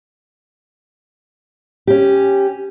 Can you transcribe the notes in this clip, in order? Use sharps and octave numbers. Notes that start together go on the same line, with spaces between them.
C#4 G4